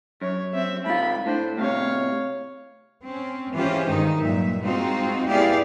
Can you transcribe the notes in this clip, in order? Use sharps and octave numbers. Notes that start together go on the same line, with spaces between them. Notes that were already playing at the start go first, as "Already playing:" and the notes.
F#2 C#5
C4 E5
G#2 F4 B5
A2 D4 C5
A2 C3 C#5 F5
C4 C#4
E3 G#3 C#4 F4 G4 C5
G2 D#3 G#3 D#4
G2 A#2 F#3 E5
G#3 C4 D#4 F4 F#4
B3 E4 G4 G#4 D5 F5